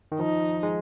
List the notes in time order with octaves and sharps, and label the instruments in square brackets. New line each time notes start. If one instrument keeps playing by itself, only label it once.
[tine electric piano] D#3
[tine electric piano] F3 [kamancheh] D#4
[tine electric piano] G#3